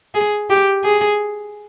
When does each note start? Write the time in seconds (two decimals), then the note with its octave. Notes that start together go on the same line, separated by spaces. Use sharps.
0.15 G#4
0.50 G4
0.84 G#4